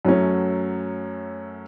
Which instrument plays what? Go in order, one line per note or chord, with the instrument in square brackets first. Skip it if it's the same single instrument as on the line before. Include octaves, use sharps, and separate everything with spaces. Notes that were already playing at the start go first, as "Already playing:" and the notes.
[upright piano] F#2 F#3 A3 C#4